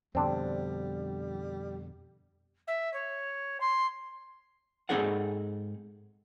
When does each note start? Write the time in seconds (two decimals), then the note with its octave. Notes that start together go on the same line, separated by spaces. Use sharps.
0.15 F2 B2 D3 G3 C4 D4
2.67 E5
2.93 C#5
3.60 C6
4.89 G#2 C4 D#4 G#4 A4 F#5